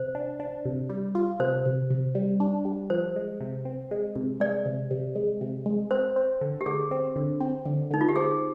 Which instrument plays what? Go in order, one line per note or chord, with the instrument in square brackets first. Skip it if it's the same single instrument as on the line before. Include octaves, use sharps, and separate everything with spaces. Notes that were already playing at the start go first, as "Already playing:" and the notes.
Already playing: [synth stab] C3 [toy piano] C5
[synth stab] D4
D4
C3
G3
F4
[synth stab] C3 [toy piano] C5
[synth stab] C3
C3
G3
D4
G3
[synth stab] F3 [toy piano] C5
[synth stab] G#3
C3
C4
G#3
C3
[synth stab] G#3 [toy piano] D5
[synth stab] C3
C3
G#3
C3
G#3
[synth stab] C4 [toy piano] C5
[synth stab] C4
D3
[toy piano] G4
[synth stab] D3 [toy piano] G#4
[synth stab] C4
D3
C4
D3
[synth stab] D3 [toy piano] D#4
[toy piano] F4
G4
[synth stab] C4 [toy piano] G#4